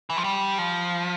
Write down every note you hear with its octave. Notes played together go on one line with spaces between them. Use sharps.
E3
F3
G3
F3